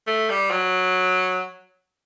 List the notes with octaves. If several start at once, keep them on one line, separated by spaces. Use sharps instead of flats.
A3
G3
F#3